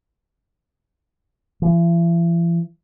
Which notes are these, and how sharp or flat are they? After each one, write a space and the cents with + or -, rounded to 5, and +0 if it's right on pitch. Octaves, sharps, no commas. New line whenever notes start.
E3 +45